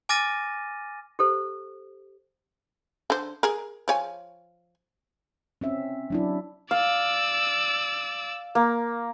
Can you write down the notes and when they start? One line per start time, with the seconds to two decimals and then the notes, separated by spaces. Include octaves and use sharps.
0.09 G#5 D6 F6 A6 A#6 D#7
1.19 G4 A4 C5
3.10 D3 C5
3.43 G#4 A#4
3.88 F3 C#5 G#5
5.61 C4 C#4 E5
6.10 F#3 D4 E4
6.71 D5 F5 E6
8.55 A#3